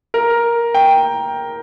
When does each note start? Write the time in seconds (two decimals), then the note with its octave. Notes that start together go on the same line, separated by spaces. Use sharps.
0.14 A#4
0.74 G5